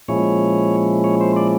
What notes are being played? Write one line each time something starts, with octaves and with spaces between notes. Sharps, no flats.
A#2 F3 G#3 C#4 E4 C#5
C#5
C5
D5